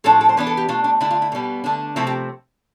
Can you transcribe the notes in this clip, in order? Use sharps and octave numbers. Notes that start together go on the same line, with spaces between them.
A2 F3 A3 D4 A4
A4
C5
E3 B3 D4 B4
A4
G4
B2 A3 D4 F4
D4
D3 A3 D4 E4
F4
E4
B2 G3 B3
D3 A3 D4
C3 F3 A3 C4 E4
G4